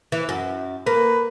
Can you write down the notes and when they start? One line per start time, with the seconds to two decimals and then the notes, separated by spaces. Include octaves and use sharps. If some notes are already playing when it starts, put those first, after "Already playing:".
0.12 E3
0.29 F#2
0.87 A#3 B4